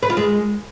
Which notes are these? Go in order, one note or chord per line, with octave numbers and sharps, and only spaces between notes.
B4
F4
G#3